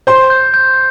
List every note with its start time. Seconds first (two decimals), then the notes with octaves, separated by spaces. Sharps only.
0.07 C5 C6 G6
0.30 G6
0.54 G6